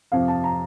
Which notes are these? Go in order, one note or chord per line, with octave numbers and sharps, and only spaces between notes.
F2 C3 F3 F5
A5
A#5